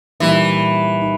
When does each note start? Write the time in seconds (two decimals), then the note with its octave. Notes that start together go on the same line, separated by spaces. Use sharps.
0.20 A#2 E3 G3 A#3 D#4
1.01 D#4